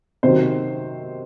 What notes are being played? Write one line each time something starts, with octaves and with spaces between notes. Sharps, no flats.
C3 D#3 F#3 C5